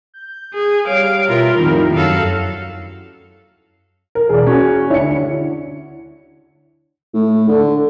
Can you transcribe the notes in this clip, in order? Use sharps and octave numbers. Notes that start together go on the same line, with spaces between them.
G6
G#4
G3 C#5 F5 D7
B2 E4 F4 A#4 E5
F2 A2 D#3 G3 E4
F#2 F#3 F#4 A4 F5
A#4
E1 G#4 D5
C#4 F#4
D2 D4 E4 C#5 C#7
A2
D3